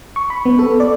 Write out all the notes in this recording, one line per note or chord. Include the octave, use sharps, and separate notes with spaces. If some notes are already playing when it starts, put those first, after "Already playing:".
C#6
B5
B3
A4
D5